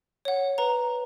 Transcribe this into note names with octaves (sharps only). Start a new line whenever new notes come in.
C#5 F#5
B4 A#5